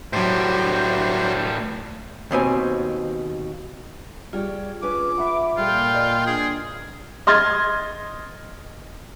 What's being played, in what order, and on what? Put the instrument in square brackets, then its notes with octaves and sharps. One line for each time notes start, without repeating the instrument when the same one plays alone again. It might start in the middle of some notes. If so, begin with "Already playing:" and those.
[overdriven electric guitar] A2 G3 [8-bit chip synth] F#3 C5
[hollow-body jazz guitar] D#2 B2 C4 G#5
[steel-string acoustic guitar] G3 C#5 G5 [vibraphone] F4 G#4
[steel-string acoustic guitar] C#4 B4 [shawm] D6
[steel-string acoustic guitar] E5 F#5 [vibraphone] B5
[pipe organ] A#2 G5 [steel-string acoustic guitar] G3 A4 [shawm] F4
[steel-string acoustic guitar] D5 D#5
[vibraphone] D4 [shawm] G#4
[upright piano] D#5 C6 F6 G#6 A6